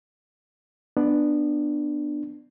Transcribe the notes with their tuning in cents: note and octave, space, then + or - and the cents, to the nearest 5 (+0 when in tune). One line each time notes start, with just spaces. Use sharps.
B3 +0 D4 +15